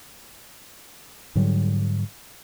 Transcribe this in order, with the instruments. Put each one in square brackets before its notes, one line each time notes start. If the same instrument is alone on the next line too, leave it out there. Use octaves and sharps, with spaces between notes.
[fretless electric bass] G#2 D3 F#3 G3